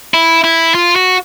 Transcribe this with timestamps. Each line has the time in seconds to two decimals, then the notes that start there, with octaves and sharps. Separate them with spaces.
0.14 E4
0.44 E4
0.75 F4
0.96 F#4